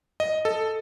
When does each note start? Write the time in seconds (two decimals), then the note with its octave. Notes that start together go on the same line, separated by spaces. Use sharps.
0.20 D#5
0.45 A4